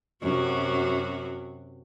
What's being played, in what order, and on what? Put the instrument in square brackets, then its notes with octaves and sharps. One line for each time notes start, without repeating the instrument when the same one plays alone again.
[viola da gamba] F#2 C3 F#4